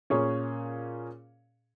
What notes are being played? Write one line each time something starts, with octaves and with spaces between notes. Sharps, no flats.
A#2 A#3 C#4 G#4 C#5